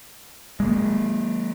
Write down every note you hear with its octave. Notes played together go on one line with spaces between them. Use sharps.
G#3 A#3